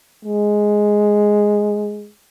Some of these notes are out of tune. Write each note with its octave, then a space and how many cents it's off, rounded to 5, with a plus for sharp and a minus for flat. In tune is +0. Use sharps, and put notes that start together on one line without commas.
G#3 +0